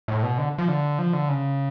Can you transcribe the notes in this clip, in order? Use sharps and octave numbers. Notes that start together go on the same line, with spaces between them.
A2
B2
D3
F3
D3
F3
D3
C#3